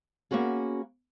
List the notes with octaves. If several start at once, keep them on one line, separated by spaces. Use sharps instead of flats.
A#3 B3 C#4 F#4 G#4